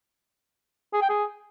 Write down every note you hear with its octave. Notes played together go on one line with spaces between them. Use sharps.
G#4
G5
G#4